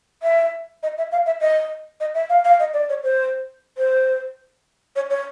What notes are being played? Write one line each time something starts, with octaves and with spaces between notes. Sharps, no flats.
E5
D#5
E5
F5
E5
D#5
D#5
E5
F5
F5
D#5
D5
C#5
C5
C5
C#5
C#5